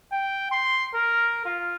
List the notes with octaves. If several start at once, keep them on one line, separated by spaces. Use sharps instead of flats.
G5
C6
A#4
F4